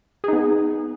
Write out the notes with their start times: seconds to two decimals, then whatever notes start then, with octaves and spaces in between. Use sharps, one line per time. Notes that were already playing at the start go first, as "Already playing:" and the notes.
0.24 G#4
0.28 D#4
0.33 B3